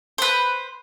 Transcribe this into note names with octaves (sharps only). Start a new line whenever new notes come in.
B4 C5